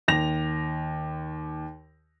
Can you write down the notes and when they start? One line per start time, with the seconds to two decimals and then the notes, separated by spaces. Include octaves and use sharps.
0.08 D#2 A#6 F7